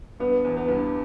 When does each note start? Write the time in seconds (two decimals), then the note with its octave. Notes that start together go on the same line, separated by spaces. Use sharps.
0.20 G2 B3
0.44 E2
0.56 B3
0.68 G2